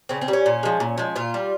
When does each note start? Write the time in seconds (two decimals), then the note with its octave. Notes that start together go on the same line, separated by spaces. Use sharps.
0.09 C#3 C4
0.22 C4
0.28 G3
0.33 C#4
0.46 A#2
0.63 F3 G#3
0.80 A#2
0.98 F3 G#3
1.16 A#2 F4
1.34 G3